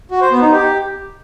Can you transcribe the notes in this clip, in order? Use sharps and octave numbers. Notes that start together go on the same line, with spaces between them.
F#4
C5
B3
D#4
G4